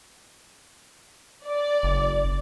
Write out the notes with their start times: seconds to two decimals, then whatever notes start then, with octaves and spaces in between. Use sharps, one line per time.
1.46 D5
1.83 F#1